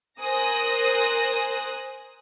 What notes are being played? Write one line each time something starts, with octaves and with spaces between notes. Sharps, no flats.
A#4 C5 G#5 D#6 F#6 A#6